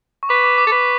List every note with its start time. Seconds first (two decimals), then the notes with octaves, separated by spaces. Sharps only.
0.23 C#6
0.29 B4 D6
0.44 D6
0.58 D6
0.67 A4
0.72 B4